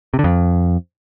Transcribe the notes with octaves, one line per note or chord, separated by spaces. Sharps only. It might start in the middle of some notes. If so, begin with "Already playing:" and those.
C3
D3
F2